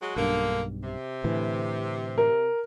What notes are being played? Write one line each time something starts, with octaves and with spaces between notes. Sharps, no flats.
F#3 G#3 F#4
B1 G2 D3 A#3
C3
A2 D3 E3
A#4